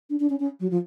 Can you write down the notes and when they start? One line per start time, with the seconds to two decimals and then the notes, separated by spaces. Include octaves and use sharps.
0.10 D4
0.20 D4
0.30 C#4
0.40 C#4
0.60 F#3
0.71 F3